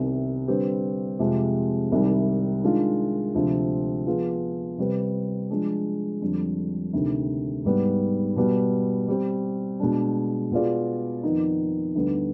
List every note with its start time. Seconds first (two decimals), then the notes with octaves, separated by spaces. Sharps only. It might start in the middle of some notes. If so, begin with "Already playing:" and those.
Already playing: C2 C3 D#3 B3
0.47 D3 G3 C4 G4 B4
1.19 F2 C3 F3 G#3
1.92 C2 C3 D#3 G3
2.63 D#3 G#3 D4 F4
3.35 D2 C3 F3 C4 F4
4.06 F3 B3 F4 G#4
4.78 C3 G3 C4 G4 B4
5.50 F3 G#3 D4
6.21 F2 D3 G3
6.93 D2 C3 D#3
7.64 G#2 G3 B3
8.36 B2 G3 B3
9.08 G3 C4 G4
9.80 B2 G#3 D4
10.51 B2 B3 F4 G#4 D5
11.23 F2 D#3 B3 D#4
11.95 D2 D3 G3 B3 D#4